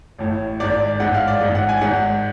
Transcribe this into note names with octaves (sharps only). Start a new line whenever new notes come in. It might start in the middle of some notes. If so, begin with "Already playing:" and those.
A1 A2
G#1 G#2 D5
A1 G#2 F#5
F5
D5
A1 G#2
F#5
G#5
G#1 G#2 F#5